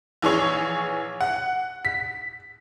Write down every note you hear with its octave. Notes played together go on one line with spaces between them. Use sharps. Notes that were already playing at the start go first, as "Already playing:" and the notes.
A#1 E3 G#4 C#5
F#5
B6